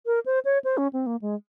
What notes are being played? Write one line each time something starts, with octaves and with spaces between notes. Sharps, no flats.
A#4
C5
C#5
C5
C#4
C4
A#3
G#3